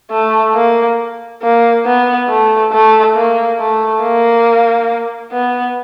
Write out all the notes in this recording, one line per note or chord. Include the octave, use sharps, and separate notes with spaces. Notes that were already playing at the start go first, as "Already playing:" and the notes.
A3
A#3
A#3
B3
A3
A3
A#3
A3
A#3
B3